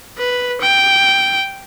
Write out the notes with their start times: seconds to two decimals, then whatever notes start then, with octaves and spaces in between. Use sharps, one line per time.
0.18 B4
0.61 G5